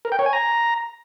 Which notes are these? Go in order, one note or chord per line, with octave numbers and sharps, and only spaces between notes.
A#4
G5
C#5
G#5
A#5